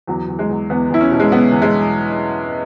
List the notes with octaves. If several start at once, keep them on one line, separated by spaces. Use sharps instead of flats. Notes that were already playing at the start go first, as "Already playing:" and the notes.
E2 F#3
E2
G#3
E2
E2 B3
E2 E4
C#4
B2
G#3
B2 B3
E2
G#3